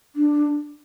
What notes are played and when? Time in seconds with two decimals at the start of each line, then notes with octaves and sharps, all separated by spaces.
0.16 D4